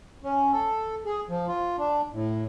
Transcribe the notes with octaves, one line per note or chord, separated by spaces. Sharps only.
C#4
A4
G#4
F3
F4
D4
A2